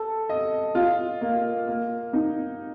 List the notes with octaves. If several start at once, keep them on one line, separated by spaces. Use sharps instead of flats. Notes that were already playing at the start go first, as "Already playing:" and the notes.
Already playing: A4
D#5
F4
A#3
A#3
D#4